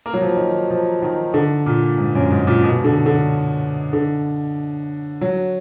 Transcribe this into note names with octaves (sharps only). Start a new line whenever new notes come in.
A#3
F#3
F3
D#3
F3
D#3
D3
A#2
G#2
F#2
G#2
A#2
B2
D3
D3
D3
F#3